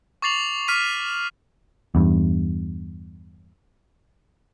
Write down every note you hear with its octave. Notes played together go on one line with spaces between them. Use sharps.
C#6 D6 A6 C7 F7 F#7
C#6 D6 F6 B6 D#7
E2 G2